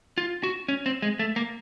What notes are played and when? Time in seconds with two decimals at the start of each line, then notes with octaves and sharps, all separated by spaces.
0.18 F4
0.43 F#4
0.69 C#4
0.86 C4
1.02 G#3
1.19 A3
1.36 A#3